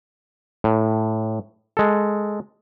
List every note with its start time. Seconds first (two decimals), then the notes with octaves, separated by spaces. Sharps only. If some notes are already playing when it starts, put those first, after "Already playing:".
0.64 A2
1.77 G#3 A4